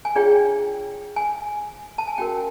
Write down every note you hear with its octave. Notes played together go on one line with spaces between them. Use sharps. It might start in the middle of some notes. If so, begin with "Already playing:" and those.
G#5
D4 F4 G#4 C#5 G5
G#5
A5
G#5
C#4 F#4 A#4 G5